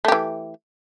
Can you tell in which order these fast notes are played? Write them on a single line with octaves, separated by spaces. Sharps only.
A3 G4 E3